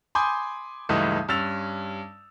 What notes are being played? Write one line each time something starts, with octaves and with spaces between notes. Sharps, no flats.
G#5 B5 C6 D6 D#6 G6
C#2 G2 E3 A3 D#4 D#6
G2 C#4 E6 A6 F7